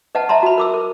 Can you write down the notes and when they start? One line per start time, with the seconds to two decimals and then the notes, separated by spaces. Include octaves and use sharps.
0.15 B4 D#5 F#5 A5
0.29 D#5 E5 A5 A#5 C6
0.43 F#4 B5
0.58 A#4 D6 E6
0.74 A#4